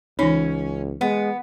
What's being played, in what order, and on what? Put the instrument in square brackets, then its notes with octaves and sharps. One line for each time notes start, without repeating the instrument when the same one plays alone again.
[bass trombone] C#2 [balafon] E3 D#4 [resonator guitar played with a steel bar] C#4
[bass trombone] G#3 [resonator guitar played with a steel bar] B3